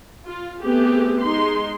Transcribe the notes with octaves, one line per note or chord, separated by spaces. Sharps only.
F4
A3 B3 C4 G4 G#4
G#3 D#4 C6